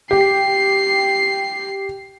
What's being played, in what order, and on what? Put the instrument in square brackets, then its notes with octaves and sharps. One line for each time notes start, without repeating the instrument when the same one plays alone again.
[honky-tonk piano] G4 [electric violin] C7